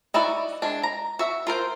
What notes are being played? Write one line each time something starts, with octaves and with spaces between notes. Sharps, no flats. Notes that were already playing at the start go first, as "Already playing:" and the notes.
D#4 E4 F#4 D5
G#3 D4
A#5
F#4 E5
F4 A#4 C5